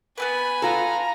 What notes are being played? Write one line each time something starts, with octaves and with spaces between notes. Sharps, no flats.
B3 C4 B4 G#5 B5
F4 A4 A#5